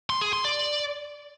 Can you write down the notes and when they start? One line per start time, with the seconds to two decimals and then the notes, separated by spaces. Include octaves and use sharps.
0.10 C6
0.21 G#4
0.33 C6
0.45 D5